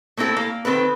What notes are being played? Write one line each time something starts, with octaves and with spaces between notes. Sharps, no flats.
A3 A#3 C4 E4 A4
A#3
D#3 C4 A4 B4